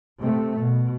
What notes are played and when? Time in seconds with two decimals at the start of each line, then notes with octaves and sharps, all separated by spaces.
0.23 C3 A3
0.61 B2